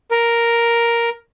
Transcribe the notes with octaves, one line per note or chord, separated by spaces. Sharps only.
A#4